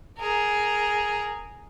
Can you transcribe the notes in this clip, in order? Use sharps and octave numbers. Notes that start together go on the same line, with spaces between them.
G#4 A#4